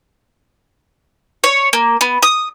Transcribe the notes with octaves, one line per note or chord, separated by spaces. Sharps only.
C#5
A#3
B3
D#6